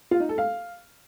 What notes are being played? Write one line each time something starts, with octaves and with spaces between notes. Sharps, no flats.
F4
D#4
A4
F5